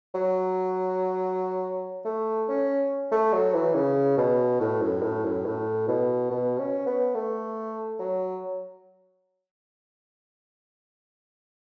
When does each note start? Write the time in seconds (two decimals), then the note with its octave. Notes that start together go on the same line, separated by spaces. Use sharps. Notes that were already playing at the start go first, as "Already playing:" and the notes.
0.15 F#3
2.05 A3
2.48 C#4
3.12 A3
3.33 F#3
3.54 E3
3.75 C#3
4.17 B2
4.61 A2
4.81 F#2
5.03 A2
5.24 F#2
5.46 A2
5.88 B2
6.31 B2
6.59 C#4
6.86 B3
7.15 A3
7.99 F#3